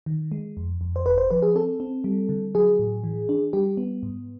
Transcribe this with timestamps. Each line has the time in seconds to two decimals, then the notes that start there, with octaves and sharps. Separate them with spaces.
0.06 D#3
0.32 G#3
0.57 F2
0.81 F2
0.96 C5
1.05 G1 B4
1.18 C5
1.31 F3 B4
1.42 G#4
1.55 C4 A4
1.80 C4
2.04 G3
2.29 D3
2.55 F#3 G#4
2.79 A2
3.04 E3
3.29 D4
3.53 G3 G4
3.77 B3
4.03 G#2